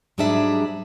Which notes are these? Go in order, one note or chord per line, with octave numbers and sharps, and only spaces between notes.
G#2 F#3 G3 D4 G#4 E5